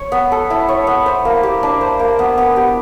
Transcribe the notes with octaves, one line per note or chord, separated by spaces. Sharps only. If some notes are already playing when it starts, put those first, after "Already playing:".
Already playing: C#5
B3
A4
E4
C#5
B3
C5
A#3
G4
D4
C5
A#3
B3
B3
G4